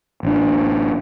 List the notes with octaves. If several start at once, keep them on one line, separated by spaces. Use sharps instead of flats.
A1 D4